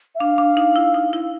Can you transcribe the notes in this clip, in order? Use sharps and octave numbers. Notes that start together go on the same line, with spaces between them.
E5
D4 F5
D4
D#4
E4
D#4
E4